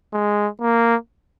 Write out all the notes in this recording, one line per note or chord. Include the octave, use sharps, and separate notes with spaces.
G#3
A#3